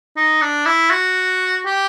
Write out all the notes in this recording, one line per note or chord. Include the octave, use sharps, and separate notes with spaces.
D#4
D4
E4
F#4
G4